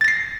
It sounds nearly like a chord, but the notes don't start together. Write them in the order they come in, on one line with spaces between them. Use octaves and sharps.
A6 A#6 C7